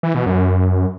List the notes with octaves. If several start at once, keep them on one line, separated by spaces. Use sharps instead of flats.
E3
B2
F#2